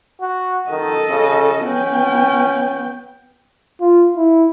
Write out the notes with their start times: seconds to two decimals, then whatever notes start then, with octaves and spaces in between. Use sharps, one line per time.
0.22 F#4
0.70 D#3 A4 D#5
1.10 C#3
1.67 B3 C#4 G5
3.81 F4
4.17 E4